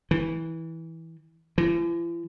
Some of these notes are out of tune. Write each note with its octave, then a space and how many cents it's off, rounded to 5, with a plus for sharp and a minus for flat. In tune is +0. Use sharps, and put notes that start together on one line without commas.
E3 -15
E3 +45